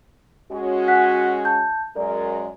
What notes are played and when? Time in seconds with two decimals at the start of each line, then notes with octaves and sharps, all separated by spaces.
0.52 G#3 C#4 F#4
0.88 F#5 F#6 B6
1.45 A5 G6
1.96 F#2 G#3 A#4 D5